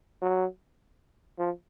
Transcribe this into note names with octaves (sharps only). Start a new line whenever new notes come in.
F#3
F3